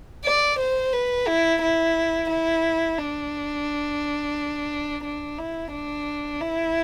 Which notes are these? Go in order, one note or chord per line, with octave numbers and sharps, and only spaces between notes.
D5
C5
B4
E4
E4
E4
D4
D4
E4
D4
E4